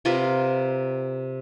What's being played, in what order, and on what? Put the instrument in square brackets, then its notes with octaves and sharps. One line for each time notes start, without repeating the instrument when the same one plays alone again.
[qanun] C3 F4 A#4 B4